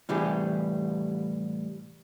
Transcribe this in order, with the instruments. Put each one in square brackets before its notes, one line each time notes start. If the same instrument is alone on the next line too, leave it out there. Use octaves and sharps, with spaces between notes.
[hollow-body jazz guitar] A2 C3 E3 G3 G4 G#4